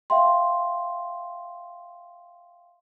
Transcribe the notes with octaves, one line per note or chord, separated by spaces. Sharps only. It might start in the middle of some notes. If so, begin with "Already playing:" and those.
E5 F5 G5 C6